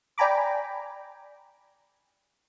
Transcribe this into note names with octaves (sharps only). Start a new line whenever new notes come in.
D5 G5 G#5 A#5 B5 D6